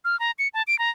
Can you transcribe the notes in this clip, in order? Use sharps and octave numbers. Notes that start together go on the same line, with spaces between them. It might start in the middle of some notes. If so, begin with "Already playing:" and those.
F6
A#5
C#7
A5
D7
A#5